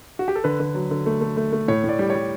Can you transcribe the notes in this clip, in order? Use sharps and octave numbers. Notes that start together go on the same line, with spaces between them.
F#4
G4
A4
D3 B4
D3
F#3
D3
A3
A3
A3
A3
A2 C#5
A2
D5
G3
C#5
G3